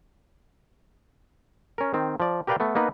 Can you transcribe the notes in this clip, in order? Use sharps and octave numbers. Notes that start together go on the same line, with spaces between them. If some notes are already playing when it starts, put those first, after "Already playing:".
C#4 A#4
D#3 C4
F3 D5
G4 A#4 B4 D5 F5 G5
A3 B3
A#3 B3 D#4 B4